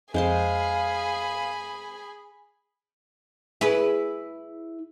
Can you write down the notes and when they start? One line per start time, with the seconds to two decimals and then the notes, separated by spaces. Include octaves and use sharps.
0.14 F2 G#3 G#4 C5 F5 B5 C6
3.61 E4 G#4 B4